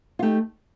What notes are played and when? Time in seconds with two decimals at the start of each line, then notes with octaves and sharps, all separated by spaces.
0.19 F4
0.23 A3 D#4 G4